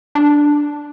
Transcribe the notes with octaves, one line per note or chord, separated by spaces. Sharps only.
D4